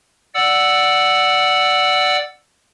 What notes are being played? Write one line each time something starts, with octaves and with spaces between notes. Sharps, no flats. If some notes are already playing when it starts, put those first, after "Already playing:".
D5 F#5 E6